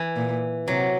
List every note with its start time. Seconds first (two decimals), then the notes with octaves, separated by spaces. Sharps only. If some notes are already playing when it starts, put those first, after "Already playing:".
Already playing: E3
0.16 A#2
0.67 C3 F#3